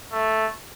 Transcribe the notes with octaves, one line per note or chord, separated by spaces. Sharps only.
A3